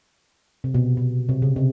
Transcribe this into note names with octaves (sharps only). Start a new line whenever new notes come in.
C3
B2
B2
C3
C#3
C3